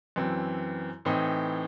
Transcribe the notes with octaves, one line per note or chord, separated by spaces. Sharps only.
F#2 E3 C4
A2 E3 C4 D#4